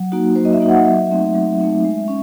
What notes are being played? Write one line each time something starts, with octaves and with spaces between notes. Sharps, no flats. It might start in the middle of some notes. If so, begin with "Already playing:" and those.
Already playing: F#3
A#3 D#4 F#4
F#3 C5
D#5
E5
A#3 D#4 F#4
F#5
F#3 E5
A3 C4 D#4
F#3
A3 C4 D#4
G#3
C#4